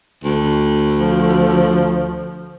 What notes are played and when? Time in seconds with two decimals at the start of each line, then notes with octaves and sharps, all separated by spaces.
0.24 D2
0.96 F3